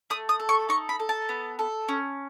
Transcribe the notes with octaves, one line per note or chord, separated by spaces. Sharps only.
A3 D#6
D#6
A4
C#6
D#4 C#6
B5
A4
A5
B3
A4
C#4